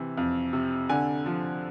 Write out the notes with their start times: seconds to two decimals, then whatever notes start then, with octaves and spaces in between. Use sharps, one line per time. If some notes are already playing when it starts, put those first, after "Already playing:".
Already playing: C3 E3
0.17 F2
0.53 C3
0.89 D3 G#5
1.26 F3